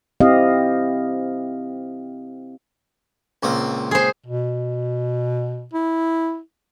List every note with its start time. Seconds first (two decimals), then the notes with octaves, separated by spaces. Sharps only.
0.21 C4 E4 G4 D#5 F5
3.43 C#2 A#2 C4
3.91 G#4 C5
4.26 B2
5.74 E4